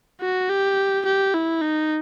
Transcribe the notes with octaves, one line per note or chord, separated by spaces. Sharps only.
F#4
G4
G4
E4
D#4